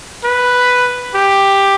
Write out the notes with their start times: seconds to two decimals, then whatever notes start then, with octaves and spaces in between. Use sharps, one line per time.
0.24 B4
1.15 G4